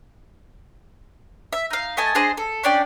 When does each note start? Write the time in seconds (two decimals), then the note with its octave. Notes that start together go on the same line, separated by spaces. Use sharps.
1.53 E5
1.71 D#4 F5
1.97 A3 D#5 G#5 A5
2.15 D4 G#4 C5 D#5
2.37 A4
2.64 C#4 D4 D5 G5